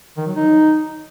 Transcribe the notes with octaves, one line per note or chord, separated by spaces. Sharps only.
D#3
F#3
D#4